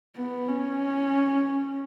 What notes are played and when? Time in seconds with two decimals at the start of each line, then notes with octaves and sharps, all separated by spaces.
0.17 B3
0.48 C#4